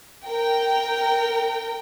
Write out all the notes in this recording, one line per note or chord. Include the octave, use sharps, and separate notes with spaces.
A#4 G5